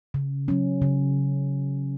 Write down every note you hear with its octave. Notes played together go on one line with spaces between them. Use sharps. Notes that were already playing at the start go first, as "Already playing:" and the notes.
C#3
F#3 C#4
C#3